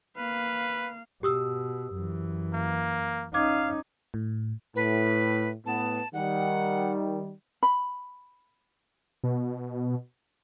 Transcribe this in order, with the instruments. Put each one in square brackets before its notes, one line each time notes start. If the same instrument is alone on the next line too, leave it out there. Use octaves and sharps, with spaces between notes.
[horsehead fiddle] A#3 F5 [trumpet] B4
[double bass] B2 [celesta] G4 D#6 E6
[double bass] F#2 E3
[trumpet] A#3
[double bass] C#4 D#4 [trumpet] F5 [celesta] D6 G#6
[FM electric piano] A2
[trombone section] A2 [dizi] B4
[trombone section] A2 B3 [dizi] A5
[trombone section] D#3 G3 [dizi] F#5
[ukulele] B5
[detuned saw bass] B2